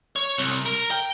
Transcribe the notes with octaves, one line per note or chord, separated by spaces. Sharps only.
C#5
C2
A#4
G5